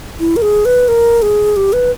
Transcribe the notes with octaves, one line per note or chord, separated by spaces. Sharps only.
E4
A#4
G#4
B4
A#4
G#4
G4
B4